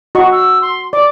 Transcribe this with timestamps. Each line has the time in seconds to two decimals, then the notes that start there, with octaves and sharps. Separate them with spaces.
0.15 F#4 D#5 C#6
0.32 E6
0.62 C6
0.93 D5 D6